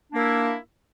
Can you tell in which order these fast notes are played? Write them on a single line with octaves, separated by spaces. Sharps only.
D4 A#3 E4